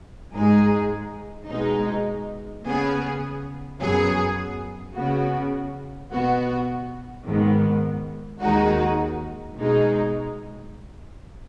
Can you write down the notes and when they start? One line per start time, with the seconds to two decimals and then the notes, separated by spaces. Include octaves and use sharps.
0.34 G#2 G#3 D#4 G#4
1.49 B2 G#3 D#4
2.65 C#3 B3 G#4
3.80 F#2 F#3 B3 G#4
4.94 C#3 B3 F#4
6.11 B2 B3 F#4
7.25 G#2 D#3 B3
8.41 D#2 D#3 G#3 D#4 F#4
9.56 B2 G#3 D#4